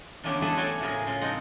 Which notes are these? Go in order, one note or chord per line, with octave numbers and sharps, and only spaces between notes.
D3 E3 A#3 B3 C#4 G4
E4 G#4 A4 B4 E5 F#5
A3 F#4 C#5 D5 G5 G#5
A2 C#3 F3 G#4 A#4 G#5
C#3 F4
F3 C4 D#4 F#5